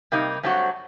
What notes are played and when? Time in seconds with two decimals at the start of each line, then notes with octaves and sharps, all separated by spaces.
0.12 C3 G3 A#3 D#4
0.43 G2 F#3 A3 C4 F#4